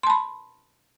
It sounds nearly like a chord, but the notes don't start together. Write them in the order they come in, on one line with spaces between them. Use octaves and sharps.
C6 A5 B5